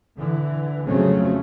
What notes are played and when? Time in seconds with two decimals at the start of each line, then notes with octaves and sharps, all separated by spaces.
0.17 D3 E3
0.85 F2 C#3 F#3 A3 C4 C#4